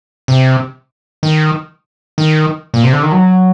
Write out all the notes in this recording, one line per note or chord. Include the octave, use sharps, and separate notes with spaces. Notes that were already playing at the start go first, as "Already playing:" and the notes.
C3
D#3
D#3
A#2
C3
D3
D#3
F#3